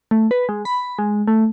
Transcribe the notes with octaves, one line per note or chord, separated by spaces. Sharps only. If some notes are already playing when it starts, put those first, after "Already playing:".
A3
B4
G#3
B5
G#3
A3